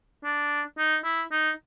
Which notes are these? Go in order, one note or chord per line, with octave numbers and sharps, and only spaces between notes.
D4
D#4
E4
D#4